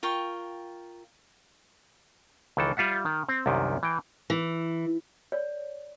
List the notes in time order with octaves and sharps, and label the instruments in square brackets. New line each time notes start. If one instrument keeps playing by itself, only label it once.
[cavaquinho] F4 A#4 G5 C#6
[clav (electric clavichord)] C#2 D#3 E3 A4
G3 F4 E5 F#5
D#3
C4
C2 F#2 C3 D#3
E3 G5
[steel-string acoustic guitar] E3
[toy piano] C#5 D5